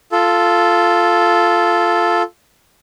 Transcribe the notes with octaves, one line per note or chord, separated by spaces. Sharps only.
F4 A4